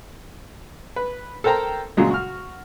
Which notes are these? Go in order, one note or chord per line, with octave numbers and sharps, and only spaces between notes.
B4
A4 A#4 C5 G5 A#5
A#2 C#3 F#3 G#3
F#4 F6